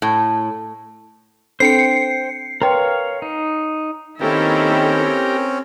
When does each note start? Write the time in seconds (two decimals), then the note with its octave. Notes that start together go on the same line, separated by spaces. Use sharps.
0.02 A2
1.60 C4 D4 A4 C5 G5 C7 C#7
2.62 A#4 B4 C#5 F5 G5 C6
3.22 D#4
4.21 D#3 A#3 C4 C#4 E4 G4 A4 A#4